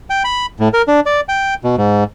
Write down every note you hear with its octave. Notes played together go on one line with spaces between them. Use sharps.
G5
B5
A2
A#4
D4
D5
G5
B2
G#2